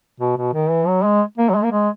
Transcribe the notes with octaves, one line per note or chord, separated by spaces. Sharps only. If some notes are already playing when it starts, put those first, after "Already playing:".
B2
B2
D#3
E3
F#3
G#3
A#3
F#3
G#3
A#3
G#3